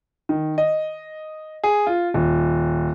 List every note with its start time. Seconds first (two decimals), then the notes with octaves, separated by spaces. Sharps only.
0.29 D#3
0.58 D#5
1.64 G#4
1.87 F4
2.14 D#1